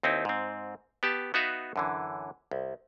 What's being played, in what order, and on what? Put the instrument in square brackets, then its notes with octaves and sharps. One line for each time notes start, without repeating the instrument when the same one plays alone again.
[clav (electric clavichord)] D#2 C4 D#4 E4
G#2 C4
B3 G4 A5
B3 D#4 F#4 B4 E5 F5
F#2 D3 E3
C2